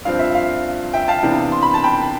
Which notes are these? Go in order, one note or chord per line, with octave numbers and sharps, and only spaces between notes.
G2 F3 C4 F5
E5
F5
E5 G5
F5 A5
C3 E3 B3 D4
C6
B5
A5
G5 B5